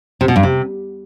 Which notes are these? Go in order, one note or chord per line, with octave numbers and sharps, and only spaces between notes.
C3
B2
G2
C3